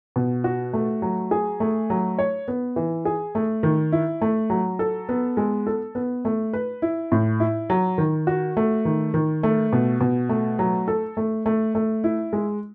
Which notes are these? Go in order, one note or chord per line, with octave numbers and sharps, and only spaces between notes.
B2
F#4
A3
F#3
G#4
A3
F#3
C#5
B3
E3
G#4
A3
D#3
E4
A3
F#3
A4
B3
G#3
A4
B3
A3
B4
E4
A2
E4
F#3
D#3
F#4
A3
D#3
D#3
A3
B2
B2
A3
F#3
A4
A3
A3
A3
E4
G#3